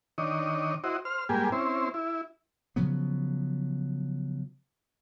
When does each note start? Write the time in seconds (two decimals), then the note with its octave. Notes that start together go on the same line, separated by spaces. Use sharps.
0.18 D#3 D4 C#5 D#5
0.84 E4 F#4 C5 D#5
1.05 C5 F6
1.29 G#2 G3 A#3 G4 G#5
1.52 C4 C#4 E4 C5
1.94 E4
2.76 C#3 F3 F#3 B3